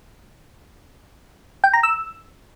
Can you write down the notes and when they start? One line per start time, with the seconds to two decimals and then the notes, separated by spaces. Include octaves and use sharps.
1.64 G5
1.73 A#5
1.83 E6